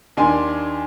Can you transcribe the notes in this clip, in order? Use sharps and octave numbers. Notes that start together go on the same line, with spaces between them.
D#2 D4 G#5 C6